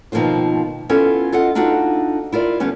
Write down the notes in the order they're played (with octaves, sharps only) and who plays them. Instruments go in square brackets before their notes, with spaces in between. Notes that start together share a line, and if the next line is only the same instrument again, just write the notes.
[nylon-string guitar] B2 D#3 F3 A#3 C4 F4
B3 C#4 E4 F4 A4
F4 A4 D#5 F#5
D4 D#4 F4 F#4 A4 F#5
E4 F4 A#4 D5
D3 G3 B3 C#4